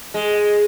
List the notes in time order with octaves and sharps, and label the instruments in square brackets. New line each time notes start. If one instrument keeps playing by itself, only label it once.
[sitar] G#3